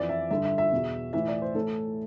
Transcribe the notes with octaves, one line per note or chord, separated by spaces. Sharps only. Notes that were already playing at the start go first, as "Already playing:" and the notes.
Already playing: F2 E3 D5
E5
G2 D3 E5
E5
E5
E2 B2
A2 E3 E5
D5
C5
A2 E3 A4